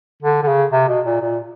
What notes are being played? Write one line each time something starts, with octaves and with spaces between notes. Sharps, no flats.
D3
D3
C#3
C3
B2
A#2
A#2